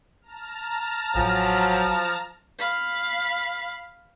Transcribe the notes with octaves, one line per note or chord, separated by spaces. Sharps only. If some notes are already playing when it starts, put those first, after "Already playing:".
A5 A#5 F6
A1 F3 F#3 G#5 A#6
F5 B5